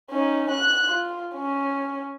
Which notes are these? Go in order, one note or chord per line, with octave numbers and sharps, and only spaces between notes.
C#4 D#4
F#6
F4
C#4